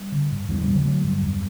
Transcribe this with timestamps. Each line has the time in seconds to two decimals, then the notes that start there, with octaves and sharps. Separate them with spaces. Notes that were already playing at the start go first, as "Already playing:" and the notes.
Already playing: G3
0.12 D3
0.31 G2
0.49 E2 E3 G3
0.61 E3 G3
0.67 B2
0.73 D3 F#3
0.85 D3 F#3 A3
1.04 G2
1.22 E2